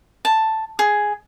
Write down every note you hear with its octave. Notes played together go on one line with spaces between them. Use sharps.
A5
G#4